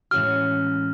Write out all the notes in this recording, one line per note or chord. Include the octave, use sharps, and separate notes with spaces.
A2 E3 G#3 C#4 F#4 F6